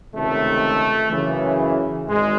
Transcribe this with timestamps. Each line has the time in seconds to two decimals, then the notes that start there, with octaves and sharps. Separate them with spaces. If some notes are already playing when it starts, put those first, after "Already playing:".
0.14 C#2 C3 D#3 A3
1.11 F#2 C#3 E3
2.07 G#1 G#2 G#3